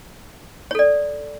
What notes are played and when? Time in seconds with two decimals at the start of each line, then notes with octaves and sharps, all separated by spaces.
0.71 C#5
0.75 A4
0.79 D5